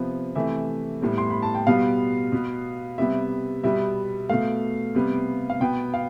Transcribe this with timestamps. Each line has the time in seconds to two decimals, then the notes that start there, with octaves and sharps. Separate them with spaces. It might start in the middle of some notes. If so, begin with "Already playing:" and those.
Already playing: C3 F3 B3
0.35 C3 E3 A3 E5
1.01 A2 G3 B3
1.18 C6
1.30 B5
1.42 A5
1.54 G5
1.67 B2 G3 B3 F5
2.32 B2 B3
2.98 C3 G3 B3 E5
3.64 B2 G3 B3 E5
4.29 B2 A3 F5
4.94 C3 G3 B3
5.50 F5
5.60 B2 B3 G5
5.94 F5